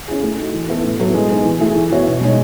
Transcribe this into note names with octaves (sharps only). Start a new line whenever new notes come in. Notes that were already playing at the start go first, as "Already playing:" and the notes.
C#4 E4 G#4
A3
D#4 F#4
E3
B3 E4 A4
A2
F#3 B3 E4 A4
G#3
B3 D#4
E3
A3 E4 G#4
E3
B3 F#4 C#5 E5
B2
G#3 D#4 G#4 C#5